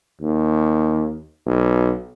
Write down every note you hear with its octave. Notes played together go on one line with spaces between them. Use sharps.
D#2
B1